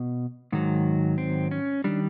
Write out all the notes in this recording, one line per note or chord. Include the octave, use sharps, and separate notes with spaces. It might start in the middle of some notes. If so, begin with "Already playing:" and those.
Already playing: B2
G#2 D#3 F#3
C4
C#4
D#3 G3 D4